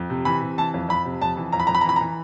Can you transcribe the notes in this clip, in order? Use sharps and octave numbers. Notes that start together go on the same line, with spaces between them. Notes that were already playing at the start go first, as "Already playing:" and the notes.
Already playing: F2
C3
E3 B5
C3
E3 A5
F2
F2 B5
C3
F2 A5
E3
F2 A#5
B5
F2 A#5
B5
A#5
E3 B5
A#5
E3